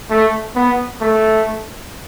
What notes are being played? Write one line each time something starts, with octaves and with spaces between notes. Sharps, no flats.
A3
B3
A3